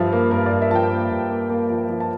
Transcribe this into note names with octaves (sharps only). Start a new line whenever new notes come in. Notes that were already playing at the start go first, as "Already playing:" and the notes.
Already playing: G2 F3 E5 F5
A#3
G2 A#4
D5
G2
E5
F3 G5 A5
A#3
G2
A#3
A#3
F3
F3
A5